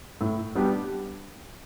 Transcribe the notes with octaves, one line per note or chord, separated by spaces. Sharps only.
A2
G3 B3 D4 G4